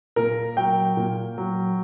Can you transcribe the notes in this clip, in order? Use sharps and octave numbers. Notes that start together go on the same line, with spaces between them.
A#2 A#4
F#3 G5
A#2
F#3